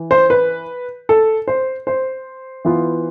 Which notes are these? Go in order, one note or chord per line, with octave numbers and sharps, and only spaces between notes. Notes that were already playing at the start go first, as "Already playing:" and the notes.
Already playing: E3
C5
B4
A4
C5
C5
E3 B3 F4